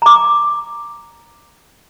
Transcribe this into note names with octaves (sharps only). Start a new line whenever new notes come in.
A#5 D6